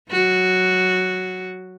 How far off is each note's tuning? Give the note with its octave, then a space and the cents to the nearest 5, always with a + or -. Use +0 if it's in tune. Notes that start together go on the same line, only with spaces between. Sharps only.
F#3 +0 F#4 +0